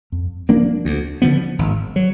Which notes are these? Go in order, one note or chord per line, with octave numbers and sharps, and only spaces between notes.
F2
F3 A#3 D4
D2
D3 F3 B3
G#1
F#3